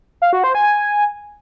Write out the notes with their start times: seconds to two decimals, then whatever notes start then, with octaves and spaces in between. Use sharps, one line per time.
0.22 F5
0.33 F#4
0.44 C5
0.55 G#5
0.66 G#5